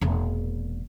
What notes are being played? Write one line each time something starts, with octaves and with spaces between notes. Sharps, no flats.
E1 A#2